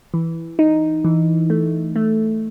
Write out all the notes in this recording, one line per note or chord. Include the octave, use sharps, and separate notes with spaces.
E3
D#4
E3
A3
A3